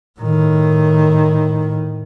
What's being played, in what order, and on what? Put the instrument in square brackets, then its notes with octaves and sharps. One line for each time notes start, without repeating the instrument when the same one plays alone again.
[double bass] A2 D#3